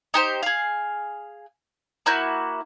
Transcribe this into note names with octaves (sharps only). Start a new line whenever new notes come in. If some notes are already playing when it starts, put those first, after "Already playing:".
D#4 G4 C5
G#4 F5
A#3 E4 F#4 G6